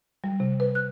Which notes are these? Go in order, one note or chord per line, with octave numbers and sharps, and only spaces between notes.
G3
C3
B4
F#6